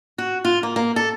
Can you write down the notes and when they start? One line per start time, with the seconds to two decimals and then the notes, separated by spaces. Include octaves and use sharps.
0.18 F#4
0.45 F4
0.63 A#3
0.76 A#3
0.96 A4